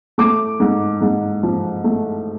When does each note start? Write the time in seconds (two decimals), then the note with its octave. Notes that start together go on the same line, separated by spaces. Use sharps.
0.18 A3 D6
0.60 G#2
1.01 G#2
1.43 F3
1.84 A3